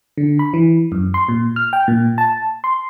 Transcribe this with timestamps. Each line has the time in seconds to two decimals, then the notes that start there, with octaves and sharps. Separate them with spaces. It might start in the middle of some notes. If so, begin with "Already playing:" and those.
0.18 D3
0.39 B5
0.54 E3
0.92 F#2
1.14 C6
1.29 A#2
1.56 F6
1.73 G5
1.88 A#2
2.18 A5
2.64 C6